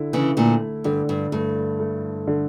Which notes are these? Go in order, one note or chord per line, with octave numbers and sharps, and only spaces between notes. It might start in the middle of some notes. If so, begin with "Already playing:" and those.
Already playing: D3 E4
C#3 E3
A#2 D3 A3
G2 D3
G2
G2 A3
A3
D3